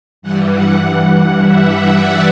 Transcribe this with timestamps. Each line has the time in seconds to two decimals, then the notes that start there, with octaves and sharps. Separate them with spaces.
0.22 G2 E3 G3 F#5
0.52 F#5
0.80 F#5
1.38 E5
1.95 D5